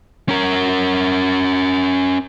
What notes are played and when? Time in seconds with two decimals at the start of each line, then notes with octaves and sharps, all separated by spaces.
0.29 C#4 A#4